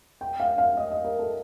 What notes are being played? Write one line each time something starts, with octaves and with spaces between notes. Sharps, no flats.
G5
F5
F5
D#5
D#5
A#4
A4